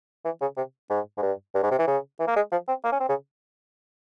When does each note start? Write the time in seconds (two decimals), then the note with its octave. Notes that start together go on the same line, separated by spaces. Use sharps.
0.25 E3
0.41 C#3
0.57 C3
0.90 G#2
1.18 G#2
1.22 G2
1.55 G2
1.63 G#2
1.71 C3
1.79 E3
1.87 C#3
2.20 E3
2.28 A#3
2.36 G#3
2.52 F3
2.68 C4
2.84 A#3
2.92 C#4
3.00 C4
3.09 C#3